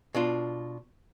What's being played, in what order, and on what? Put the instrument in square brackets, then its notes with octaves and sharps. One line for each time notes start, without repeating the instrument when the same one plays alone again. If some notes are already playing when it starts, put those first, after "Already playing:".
[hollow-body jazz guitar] B2 D4 F4